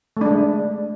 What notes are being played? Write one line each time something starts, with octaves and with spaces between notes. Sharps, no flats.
G#3 A3 D4